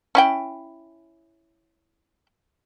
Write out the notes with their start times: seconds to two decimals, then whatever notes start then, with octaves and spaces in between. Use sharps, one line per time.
0.15 C#4 E4 G5